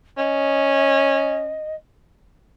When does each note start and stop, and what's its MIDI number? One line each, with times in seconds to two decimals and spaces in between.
0.17 1.60 61
0.17 1.75 75